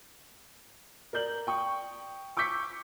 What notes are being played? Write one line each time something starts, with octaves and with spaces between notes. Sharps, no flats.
A#4 D5 G6 F#7
G5 C#6 D#6
C#6 D6 E6 G6 B6 C#7